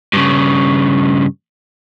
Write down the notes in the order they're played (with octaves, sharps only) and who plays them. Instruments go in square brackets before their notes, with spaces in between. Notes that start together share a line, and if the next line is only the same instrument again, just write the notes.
[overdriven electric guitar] G2 C#3